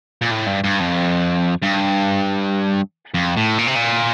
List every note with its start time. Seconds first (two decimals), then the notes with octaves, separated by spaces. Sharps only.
0.22 A#2
0.31 A2
0.47 G2
0.64 G2
0.80 F2
1.62 G2
3.14 F2
3.37 A2
3.59 A#2
3.67 C3
3.76 A#2